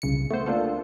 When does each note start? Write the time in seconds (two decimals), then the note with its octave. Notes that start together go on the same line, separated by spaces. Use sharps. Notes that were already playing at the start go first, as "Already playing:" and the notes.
0.02 C2 C#3 C#7
0.31 A3 B3 C5
0.46 A#3 D4 F4 A4